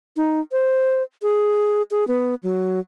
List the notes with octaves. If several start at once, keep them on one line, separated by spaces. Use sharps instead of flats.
D#4
C5
G#4
G#4
B3
F#3